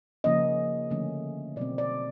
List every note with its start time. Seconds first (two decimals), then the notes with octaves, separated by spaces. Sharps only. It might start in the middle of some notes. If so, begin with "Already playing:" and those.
0.24 C#3 F3 A#3 C#4 D#5
0.90 D3 F3 A3 C#4
1.56 B2 F#3 A3 C4 D5
1.78 D5